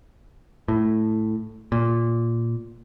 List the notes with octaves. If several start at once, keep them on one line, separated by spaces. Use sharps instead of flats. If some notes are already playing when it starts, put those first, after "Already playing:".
A2
A#2